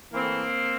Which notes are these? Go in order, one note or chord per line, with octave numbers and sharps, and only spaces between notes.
A2 E3 A#3 C4